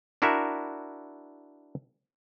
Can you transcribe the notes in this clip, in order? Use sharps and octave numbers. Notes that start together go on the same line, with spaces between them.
D4 E4 F#4 A#4 E5